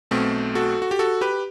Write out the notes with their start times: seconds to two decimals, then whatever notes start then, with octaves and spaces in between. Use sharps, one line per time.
0.11 B1 B2 A3 C4
0.55 F#4 A4
0.82 F#4
0.91 G4
0.99 F#4 A4
1.21 G4 B4